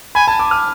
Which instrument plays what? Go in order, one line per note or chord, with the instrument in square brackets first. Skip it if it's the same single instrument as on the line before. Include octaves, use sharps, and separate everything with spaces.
[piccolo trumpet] G#5 [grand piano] B5
[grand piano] A5
D6
F6